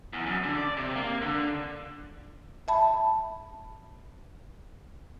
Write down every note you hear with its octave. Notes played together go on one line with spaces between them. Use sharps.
E2
F#2
D3
D5
C3
A#3
D3
E5 A5 B5